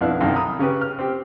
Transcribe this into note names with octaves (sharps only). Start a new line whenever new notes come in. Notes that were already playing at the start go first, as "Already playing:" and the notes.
B1 F2 B3 D4 E4 F5
B1 F#2 C3 D#3 F5 G5
A#5 B5 D#6
C#3 C#4 G4 B4
F6
C4 G4